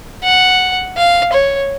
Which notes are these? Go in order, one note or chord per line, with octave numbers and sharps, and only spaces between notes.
F#5
F5
C#5